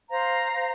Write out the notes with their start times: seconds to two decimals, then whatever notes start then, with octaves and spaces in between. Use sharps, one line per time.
0.10 C5 F5 A#5
0.53 C5